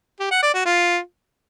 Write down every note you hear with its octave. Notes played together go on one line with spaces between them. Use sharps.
G4
F#5
D5
F#4
F4